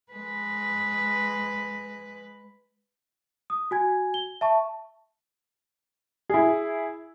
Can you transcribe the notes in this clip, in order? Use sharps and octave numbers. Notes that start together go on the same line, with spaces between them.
G#3 B4
D#6
F#4 G#5 G#6
G7
E5 A5 C#6
E4 G#4